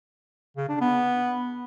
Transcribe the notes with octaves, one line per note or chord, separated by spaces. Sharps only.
C#3
D4
B3